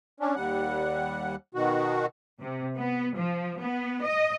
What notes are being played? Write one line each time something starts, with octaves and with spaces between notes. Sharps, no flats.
C#4 D4
D#2 G3 F#5
B2 D#3 F#4
C3
B3
F3
B3
D#5